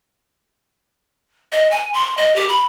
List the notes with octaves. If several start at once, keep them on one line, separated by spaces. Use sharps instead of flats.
D#5
G#5
C6
D#5
G4
B5